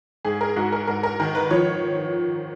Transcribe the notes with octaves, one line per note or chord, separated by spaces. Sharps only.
G#2 G#4
A#4
G#2 F#4
A#4
G#2 A#4
A#4
D#3 A#4
B4
F3 C#5